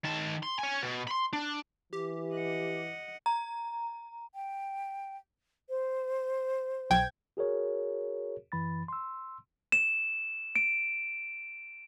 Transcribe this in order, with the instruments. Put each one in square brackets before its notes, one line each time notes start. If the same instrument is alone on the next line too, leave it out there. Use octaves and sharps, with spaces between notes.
[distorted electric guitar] D#3 A5
C6
C#5 G#5
B2
B5 C6
D4
[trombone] E3 [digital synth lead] G4
[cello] D#5 F#5
[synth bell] A#5
[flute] G5
C5
[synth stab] B1 G5 G#6
[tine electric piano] F#4 G#4 A#4 C#5
F#2 E3 B5 A6
C6 E6
[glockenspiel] E7
D7